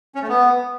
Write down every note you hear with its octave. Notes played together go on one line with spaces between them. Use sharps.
C#4
A3
B3